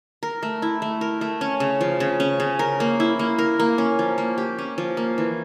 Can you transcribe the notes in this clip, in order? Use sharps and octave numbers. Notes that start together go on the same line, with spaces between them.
A#4
A3
E4
A3
A#4
A3
C#4
C#3
F3
C#3
C#4
C#3
A#4
A#3
E4
A#3
A#4
A#3
C#4
F3
A#3
G4
C#4
F3
A#3
E3